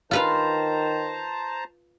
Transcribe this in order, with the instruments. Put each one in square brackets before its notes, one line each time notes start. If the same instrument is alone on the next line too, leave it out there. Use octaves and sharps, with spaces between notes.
[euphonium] D#3 [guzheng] F4 B4 F5 [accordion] C5 A5 A#5